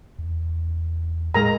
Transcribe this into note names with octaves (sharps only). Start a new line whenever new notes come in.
E2
A2 G#3 A#4 A#5